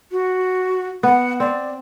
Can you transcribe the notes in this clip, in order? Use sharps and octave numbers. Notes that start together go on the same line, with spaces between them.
F#4
B3 F#5
C4 D5